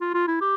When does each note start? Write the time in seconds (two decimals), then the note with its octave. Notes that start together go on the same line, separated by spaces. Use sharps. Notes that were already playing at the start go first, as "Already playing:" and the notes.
0.01 F4
0.14 F4
0.27 E4
0.41 G4